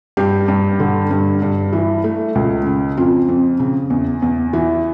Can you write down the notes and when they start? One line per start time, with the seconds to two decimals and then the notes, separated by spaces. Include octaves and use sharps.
0.17 G2 G4
0.48 G2
0.80 D3
1.11 G2
1.42 G2
1.73 E3
2.04 A3
2.35 C#2
2.66 C#3
2.97 F2 F4
3.29 F2
3.59 C#3
3.90 E2
4.22 E2
4.53 E3